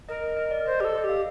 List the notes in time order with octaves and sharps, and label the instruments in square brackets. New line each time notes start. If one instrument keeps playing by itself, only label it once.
[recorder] A#4 [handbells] D#5
[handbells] D#5
D#5
D5
[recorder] C5 [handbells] D#5
[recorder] G4 [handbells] D5
[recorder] A4
[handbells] D#5
[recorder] G4
[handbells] F5